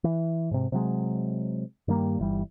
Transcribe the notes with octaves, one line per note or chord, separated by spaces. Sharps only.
E3
G#2 C3
C3 F#3 G#3
G2 D#3 G3 A#3
G1 E3 G3